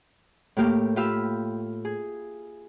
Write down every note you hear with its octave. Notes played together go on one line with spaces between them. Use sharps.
A2 A3 A#3 G4 F6
F4 G4 F5 B5 E6
G#4